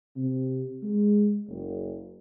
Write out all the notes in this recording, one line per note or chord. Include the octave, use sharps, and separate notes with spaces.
C3
G#3
F#1